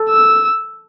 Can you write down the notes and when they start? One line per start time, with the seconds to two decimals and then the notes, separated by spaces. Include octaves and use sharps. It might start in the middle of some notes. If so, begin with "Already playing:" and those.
Already playing: A4
0.10 E6